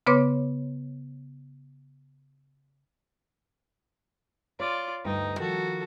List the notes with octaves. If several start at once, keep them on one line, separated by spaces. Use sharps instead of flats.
C#3 B3 B4 C#5 C6 D6
F4 C#5 D5
D2 G2 D#4 G5
D#3 F3 F#4 A4